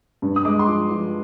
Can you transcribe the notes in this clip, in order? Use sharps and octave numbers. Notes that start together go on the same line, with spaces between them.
G2
D#6
G#3 D6
C6
F3 D6
F3